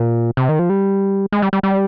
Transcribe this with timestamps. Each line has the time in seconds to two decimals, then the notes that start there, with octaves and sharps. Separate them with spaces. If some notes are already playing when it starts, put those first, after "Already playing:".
Already playing: A#2
0.37 C3
0.49 D#3
0.59 F3
0.69 G3
1.32 G#3
1.42 G3
1.53 G3
1.63 G3